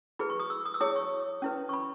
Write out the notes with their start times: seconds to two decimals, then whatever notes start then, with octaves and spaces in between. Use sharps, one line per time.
0.19 E4 G#4 B4 B5
0.30 C#6
0.40 D#6
0.50 E6
0.65 D#6
0.74 E6
0.81 E4 G#4 C#5 D#6
0.96 C#6
1.42 C#4 E4 B4
1.69 C#6
1.73 B5